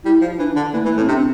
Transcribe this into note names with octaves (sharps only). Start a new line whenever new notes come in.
G3 E4
F3
E3 D4
D3
E3 A#3
A3
E3
A#3
A2
C4
C3 D4
C4